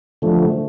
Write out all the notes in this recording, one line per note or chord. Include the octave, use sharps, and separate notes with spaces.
D3 F3 A3